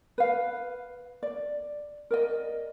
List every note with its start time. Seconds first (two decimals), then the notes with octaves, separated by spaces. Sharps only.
0.18 B4 F5
1.23 D5
2.11 A#4 D5 D#5